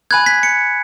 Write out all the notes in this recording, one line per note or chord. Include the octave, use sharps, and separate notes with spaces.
G#5 B5 F#6 G#6
B6
C#7